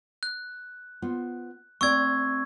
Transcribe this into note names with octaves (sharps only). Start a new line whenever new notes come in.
F#6
B3 F4 C5
A3 C4 D5 C#6 E6 G#6